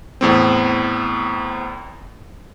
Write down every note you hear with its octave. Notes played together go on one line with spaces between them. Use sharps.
E2 A2 C4